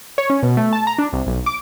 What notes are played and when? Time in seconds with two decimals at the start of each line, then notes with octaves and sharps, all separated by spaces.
0.18 C#5
0.30 C#4
0.43 B2
0.57 A3
0.73 A5
0.87 A#5
0.98 D4
1.13 C2
1.27 B1
1.46 D6